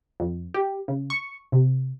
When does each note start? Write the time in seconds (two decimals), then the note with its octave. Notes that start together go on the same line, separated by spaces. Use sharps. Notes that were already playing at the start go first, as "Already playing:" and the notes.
0.20 F2
0.54 G4
0.88 C#3
1.10 C#6
1.52 C3